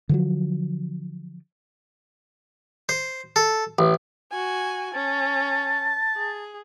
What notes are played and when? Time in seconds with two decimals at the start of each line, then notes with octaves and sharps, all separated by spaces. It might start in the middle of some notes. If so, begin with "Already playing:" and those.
0.09 D3 F3 F#3
2.89 C5
3.36 A4
3.79 A1
4.31 F#4 G#5
4.94 C#4 A5
6.16 G#4